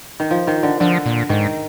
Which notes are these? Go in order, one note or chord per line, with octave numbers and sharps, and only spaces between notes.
D#3
F3
D#3
D3
D3 F3
A#2
G#2 D#3